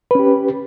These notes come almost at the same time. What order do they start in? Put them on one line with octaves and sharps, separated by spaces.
B4 C#4 G4